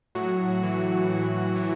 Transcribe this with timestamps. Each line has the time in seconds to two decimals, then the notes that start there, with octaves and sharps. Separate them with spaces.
0.15 A2 F#3 F#4
0.63 E3
1.09 A2
1.56 E3